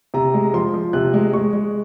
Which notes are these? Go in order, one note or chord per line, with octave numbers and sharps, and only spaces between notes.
C3 A#5
G#3
F3 C6
F3
C3 F#6
G#3
G#3 C#6
G#3